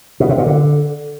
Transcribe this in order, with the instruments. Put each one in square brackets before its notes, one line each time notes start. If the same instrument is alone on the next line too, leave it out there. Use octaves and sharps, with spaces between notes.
[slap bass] B2
C3
A#2
D3